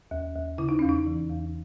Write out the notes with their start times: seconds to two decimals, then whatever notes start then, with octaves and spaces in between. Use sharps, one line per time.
0.11 D#2
0.35 D#2
0.58 C#3 E4
0.69 D#4
0.79 E2 C#4
0.89 D#4
1.06 E3
1.29 E2